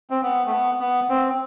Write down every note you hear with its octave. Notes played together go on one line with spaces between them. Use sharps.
C4
B3
A3
B3
B3
C4